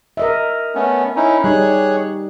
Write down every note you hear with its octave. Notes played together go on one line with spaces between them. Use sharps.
A#4 D#5 E5
A3 B3 C#4
C#4 D#4 E4
G3 D#4 G#4 C#5 F#6